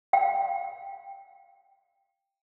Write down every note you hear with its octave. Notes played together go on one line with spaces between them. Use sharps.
F5 G5